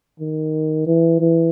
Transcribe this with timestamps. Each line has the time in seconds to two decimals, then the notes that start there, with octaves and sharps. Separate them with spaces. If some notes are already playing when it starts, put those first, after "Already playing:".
0.20 D#3
0.87 E3
1.20 E3